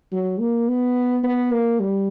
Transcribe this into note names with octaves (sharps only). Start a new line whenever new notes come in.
F#3
A#3
B3
B3
A#3
G3